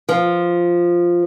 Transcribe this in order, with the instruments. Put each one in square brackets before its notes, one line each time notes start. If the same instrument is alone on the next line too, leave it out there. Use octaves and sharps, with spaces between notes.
[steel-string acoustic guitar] F3